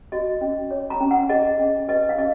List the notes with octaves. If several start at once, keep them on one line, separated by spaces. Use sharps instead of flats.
F#4 D#5
C#4
C#5
A#5
C#4
F#5
G#4 D#5
C#4
B4 D#5
F5
C#4 D#5